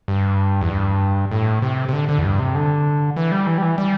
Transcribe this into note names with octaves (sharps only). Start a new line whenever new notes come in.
G2
E2
G2
A2
C3
C3
D3
D3
E2
G2
C3
D3
E3
G3
E3
G3
E3
G3